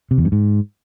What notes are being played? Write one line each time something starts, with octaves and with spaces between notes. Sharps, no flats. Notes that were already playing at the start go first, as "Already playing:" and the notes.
C3
E2
G2
G#2